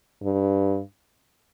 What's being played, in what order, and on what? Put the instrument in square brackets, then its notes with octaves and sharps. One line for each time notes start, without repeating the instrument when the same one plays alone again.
[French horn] G2